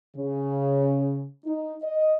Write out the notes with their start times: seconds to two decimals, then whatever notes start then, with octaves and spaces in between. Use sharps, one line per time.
0.17 C#3
1.46 D#4
1.83 D#5